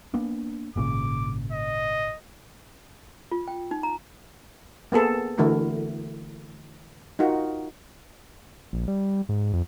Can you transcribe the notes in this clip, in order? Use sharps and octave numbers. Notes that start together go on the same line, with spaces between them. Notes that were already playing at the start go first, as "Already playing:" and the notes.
A#3 B3 D4
G#1 A#2 C#3 D6
D#5
F4
G5
D#4
A#5
A#3 B3 G#4 A4
D3 E3 A3 E4 F#4 A#4
D#4 F4 F#4 A#4
A#1
G3
G#2
F2